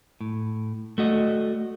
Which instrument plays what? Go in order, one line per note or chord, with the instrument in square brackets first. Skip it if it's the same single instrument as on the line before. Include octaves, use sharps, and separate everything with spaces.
[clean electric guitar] A2
A3 F#4 D#5